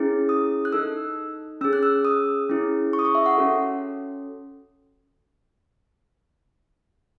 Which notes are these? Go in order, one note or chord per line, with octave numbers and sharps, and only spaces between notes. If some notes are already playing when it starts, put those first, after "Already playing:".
Already playing: C#4 E4 G#4
D#6
F#6
D#4 A4 E6
C#4 G#4 E6
F#6
E6
D#6
C#4 E4 G#4
C#6
D#6
C#6
E5
F#5
C#4 F#4 A4